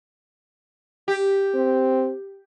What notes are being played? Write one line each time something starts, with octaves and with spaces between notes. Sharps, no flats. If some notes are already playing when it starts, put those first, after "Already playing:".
G4
C4